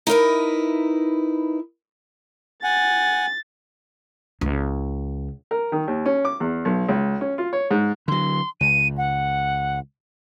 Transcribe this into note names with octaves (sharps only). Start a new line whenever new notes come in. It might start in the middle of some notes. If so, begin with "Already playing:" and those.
D#4 E4 A#4 B4
F#5 G#5 A6
C#2
A#4
D#3
D#2
C#4
D6
E2
B1
C#2
C#4
F4
C#5
G#2
D3 F#3 C6
C#2 D#7
F#5